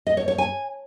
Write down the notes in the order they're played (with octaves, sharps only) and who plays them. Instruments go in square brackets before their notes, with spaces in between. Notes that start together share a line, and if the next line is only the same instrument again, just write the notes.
[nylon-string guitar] D#5
C#5
C#5
G#5